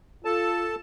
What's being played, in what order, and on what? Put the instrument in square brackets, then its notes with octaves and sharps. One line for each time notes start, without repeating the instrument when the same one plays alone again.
[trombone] F4 [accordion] A4 A5